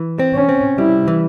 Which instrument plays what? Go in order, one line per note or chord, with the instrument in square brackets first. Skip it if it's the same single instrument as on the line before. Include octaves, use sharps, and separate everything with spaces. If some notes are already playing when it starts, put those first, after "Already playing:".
Already playing: [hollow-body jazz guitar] E3
C4
[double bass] C#4
[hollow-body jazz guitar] C4
[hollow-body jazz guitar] G3 [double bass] E4
[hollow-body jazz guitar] E3